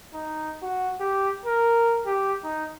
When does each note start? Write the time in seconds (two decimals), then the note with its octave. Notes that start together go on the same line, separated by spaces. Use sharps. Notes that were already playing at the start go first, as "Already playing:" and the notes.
0.14 D#4
0.62 F#4
1.00 G4
1.45 A#4
2.06 G4
2.44 D#4